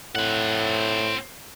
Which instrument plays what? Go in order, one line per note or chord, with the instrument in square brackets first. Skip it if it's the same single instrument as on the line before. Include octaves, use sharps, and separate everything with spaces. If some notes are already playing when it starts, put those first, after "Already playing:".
[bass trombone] A2 [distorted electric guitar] C4 F#5